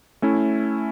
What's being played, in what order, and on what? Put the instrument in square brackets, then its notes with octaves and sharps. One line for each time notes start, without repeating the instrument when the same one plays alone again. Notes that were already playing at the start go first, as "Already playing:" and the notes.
[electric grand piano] A3 C#4 E4